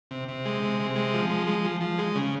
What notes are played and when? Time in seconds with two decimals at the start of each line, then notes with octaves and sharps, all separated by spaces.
0.11 C3
0.28 C3
0.45 G#3
0.62 C3
0.80 C3
0.96 G#3
1.14 F3
1.30 G#3
1.47 G#3
1.64 F3
1.81 F3
1.99 G#3
2.15 C#3